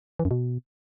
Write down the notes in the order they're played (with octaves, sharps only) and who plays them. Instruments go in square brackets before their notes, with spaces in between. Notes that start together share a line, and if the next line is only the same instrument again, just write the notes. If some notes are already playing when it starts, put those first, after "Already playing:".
[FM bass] E3
F#2
B2